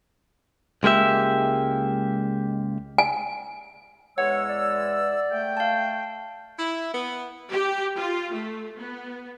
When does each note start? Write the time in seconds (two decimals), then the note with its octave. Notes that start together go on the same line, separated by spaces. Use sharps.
0.83 C#2 G#3 A#3 G4 E5
2.98 G#5
4.18 E2 G#3 C#5 F#5 E6
4.49 D5
5.30 A3 G5
5.57 F5 A5
6.58 E4
6.92 B3
7.50 G4
7.97 F4
8.33 A3
8.79 B3